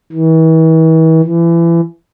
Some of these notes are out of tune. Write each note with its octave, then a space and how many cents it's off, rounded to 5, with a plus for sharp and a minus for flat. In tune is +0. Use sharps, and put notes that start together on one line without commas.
E3 -40
E3 +30